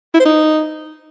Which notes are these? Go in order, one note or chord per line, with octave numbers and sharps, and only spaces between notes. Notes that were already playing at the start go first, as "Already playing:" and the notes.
E4
C5
D#4